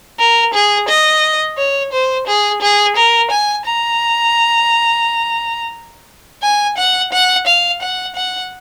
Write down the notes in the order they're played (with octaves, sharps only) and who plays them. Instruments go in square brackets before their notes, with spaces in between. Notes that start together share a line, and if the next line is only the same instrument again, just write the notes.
[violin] A#4
G#4
D#5
C#5
C5
G#4
G#4
A#4
G#5
A#5
G#5
F#5
F#5
F5
F#5
F#5